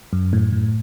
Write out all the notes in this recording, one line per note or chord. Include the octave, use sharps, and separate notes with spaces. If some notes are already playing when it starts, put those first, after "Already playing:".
F#2
A2
A2